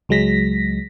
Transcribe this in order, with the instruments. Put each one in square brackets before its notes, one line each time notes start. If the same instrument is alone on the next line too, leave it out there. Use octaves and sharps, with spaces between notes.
[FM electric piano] C#2 F#3 G#3 A#6 B6